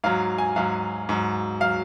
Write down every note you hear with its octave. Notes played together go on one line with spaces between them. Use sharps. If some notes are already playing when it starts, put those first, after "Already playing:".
G#2 F#3 F5
G#5
G#2 F#3 F5
G#2 F#3
F#3 F5